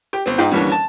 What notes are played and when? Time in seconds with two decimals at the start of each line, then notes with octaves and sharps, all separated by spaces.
0.13 G4
0.26 G1 C4
0.38 G#2 D#4 F4 G5
0.51 D#2 D3 E3 G3 C#4
0.72 A5